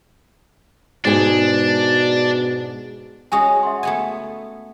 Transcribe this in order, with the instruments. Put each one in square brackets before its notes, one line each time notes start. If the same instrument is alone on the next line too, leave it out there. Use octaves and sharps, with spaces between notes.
[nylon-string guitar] G#2 G#4 [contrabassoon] B2 [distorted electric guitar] D4
[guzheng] G#3 C#4 F#4 [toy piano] G#5 C#6 D#6
[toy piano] E5 F#5 C6
[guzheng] A3 B3 G#5